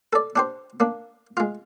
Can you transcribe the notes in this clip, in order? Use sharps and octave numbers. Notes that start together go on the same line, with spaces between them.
A4 D5
D4 G4 C5
A#3 D4
G#3 F4